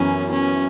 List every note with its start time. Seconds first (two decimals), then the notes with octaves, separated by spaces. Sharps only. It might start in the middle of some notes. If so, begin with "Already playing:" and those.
Already playing: F#2 E3 B3 C#4
0.31 C#4